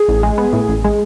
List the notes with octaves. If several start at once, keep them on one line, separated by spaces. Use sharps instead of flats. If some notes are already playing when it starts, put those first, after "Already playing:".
Already playing: G#4
A1
G#3
B3
A2
A1
G#3